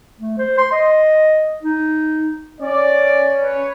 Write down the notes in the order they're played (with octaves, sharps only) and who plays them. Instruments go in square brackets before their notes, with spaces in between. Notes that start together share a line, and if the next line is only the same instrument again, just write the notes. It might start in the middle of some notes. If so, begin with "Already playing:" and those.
[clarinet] A3
C5
C6
D#5
D#4
[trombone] C#4 [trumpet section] D5
[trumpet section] B4 C#5